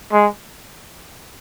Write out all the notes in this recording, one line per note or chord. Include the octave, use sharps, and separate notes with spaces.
G#3